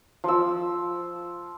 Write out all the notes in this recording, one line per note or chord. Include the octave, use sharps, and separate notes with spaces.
F3 E6